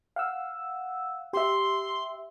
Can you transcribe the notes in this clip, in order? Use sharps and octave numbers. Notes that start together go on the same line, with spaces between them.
F5 F#5 E6
G4 E5 C6